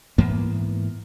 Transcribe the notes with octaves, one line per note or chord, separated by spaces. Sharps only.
G#2 E3 A#3 B3